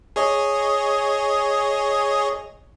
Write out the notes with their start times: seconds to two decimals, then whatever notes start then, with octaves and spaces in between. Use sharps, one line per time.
0.16 G#4 C#5 D#5